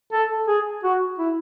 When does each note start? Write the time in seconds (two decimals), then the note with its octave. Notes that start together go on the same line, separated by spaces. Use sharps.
0.13 A4
0.48 G#4
0.84 F#4
1.19 E4